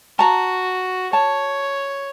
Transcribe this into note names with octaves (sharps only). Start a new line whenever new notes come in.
F#4 A5 A#5
C#5 A5